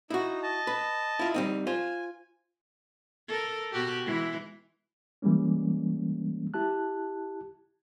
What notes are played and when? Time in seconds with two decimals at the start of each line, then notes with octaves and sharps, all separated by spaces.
0.10 D#4 E4 F#4
0.43 D#5 A5
0.67 B4
1.19 E4 F4
1.34 G3 C4 D#4
1.67 F4 C5 G#5
3.28 A4 A#4
3.72 B2 F#4 G4
4.05 E3 G#3 E4
5.22 E3 G3 G#3 A#3 C#4
6.54 E4 G4 A5 F#6